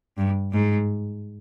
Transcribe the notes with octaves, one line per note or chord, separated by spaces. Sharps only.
G2
G#2